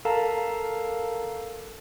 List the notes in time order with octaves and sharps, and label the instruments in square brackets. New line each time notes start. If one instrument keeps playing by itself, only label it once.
[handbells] A4 A#4 F5 A5 A#5